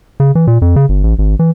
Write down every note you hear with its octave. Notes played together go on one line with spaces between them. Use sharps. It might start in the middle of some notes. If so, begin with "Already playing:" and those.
C#3
E3
A#2
F2
C#3
G1
A1
G#1
E3